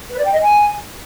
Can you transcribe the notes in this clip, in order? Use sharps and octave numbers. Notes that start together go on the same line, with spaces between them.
B4
D5
G5
D#5
G#5